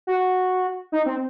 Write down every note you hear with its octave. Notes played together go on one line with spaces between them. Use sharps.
F#4
D#4
C4